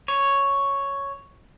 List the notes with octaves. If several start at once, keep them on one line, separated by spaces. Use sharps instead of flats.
C#5